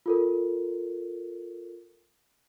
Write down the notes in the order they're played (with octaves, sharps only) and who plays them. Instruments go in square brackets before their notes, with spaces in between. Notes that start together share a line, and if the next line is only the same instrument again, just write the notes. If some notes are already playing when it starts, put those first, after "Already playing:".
[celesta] F4 A4 A#4